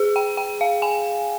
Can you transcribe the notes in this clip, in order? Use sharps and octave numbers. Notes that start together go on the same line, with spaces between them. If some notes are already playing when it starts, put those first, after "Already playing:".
Already playing: G#4
G5
G5
F5
G#5